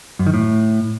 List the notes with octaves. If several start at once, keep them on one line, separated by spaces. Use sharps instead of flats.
F#2
D#3
A2